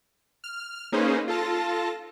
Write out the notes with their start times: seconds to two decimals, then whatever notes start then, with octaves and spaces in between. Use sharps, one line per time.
0.44 F6
0.92 A#3 C#4 D#4 G#4 B4 C5
1.28 F4 A4 A5 A#6